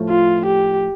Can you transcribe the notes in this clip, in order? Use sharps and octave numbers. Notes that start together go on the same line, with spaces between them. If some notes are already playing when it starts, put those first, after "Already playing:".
Already playing: A2 F3 A3
F4
G4